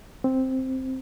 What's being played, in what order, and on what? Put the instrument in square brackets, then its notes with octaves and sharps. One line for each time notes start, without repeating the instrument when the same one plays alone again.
[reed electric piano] C4